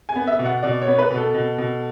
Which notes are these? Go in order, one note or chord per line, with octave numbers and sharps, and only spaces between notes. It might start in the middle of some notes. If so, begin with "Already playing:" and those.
G#5
B3
E5
B2
F#5
B2 D5
C#5
B3
B4
B2
A4
B2
B2